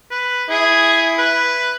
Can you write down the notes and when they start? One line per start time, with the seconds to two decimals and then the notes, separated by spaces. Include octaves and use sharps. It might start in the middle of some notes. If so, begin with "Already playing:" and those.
0.11 B4
0.50 E4 G#4
1.18 B4